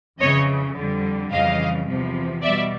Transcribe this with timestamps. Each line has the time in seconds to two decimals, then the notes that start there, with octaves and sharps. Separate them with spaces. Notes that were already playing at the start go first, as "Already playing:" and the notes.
0.20 F2 C#3 E3 C#5 D#5
0.75 F2 D3 G3
1.31 F2 C#3 E3 G3 D#5 F5
1.87 E2 C3 F3
2.42 B2 G3 D5 E5